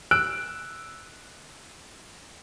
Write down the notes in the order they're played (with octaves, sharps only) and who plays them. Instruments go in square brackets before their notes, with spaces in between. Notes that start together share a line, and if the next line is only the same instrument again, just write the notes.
[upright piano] E6 F#6 D7